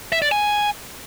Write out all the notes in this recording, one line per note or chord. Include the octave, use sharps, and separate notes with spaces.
E5
D5
G#5